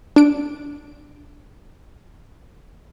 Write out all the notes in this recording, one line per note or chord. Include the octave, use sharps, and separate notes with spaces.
D4 D7